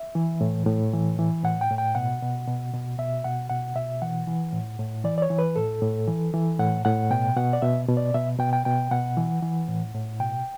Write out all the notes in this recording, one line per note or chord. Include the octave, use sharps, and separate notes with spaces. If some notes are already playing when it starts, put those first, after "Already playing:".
Already playing: E5
E3
A2
A2
E3
E3
A2 F#5
G5
A2
G5
B2 F#5
B2
B2
B2
B2 E5
B2 F#5
B2 F#5
B2 E5
E3 F#5
E3
A2
A2
E3 D5
D5
C#5
E3
B4
A2 A4
A2
E3
E3
A2 F#5
A2 F#5
B2 G5
B2 F#5
D5
B2 E5
B2
D5
B2 E5
B2 G5
G5
B2 G5
B2 F#5
E3
E3
A2
A2
B2 G5